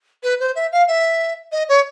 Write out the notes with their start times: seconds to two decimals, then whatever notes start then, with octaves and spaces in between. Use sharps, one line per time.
0.23 B4
0.40 C5
0.56 E5
0.72 F5
0.88 E5
1.52 D#5
1.69 C#5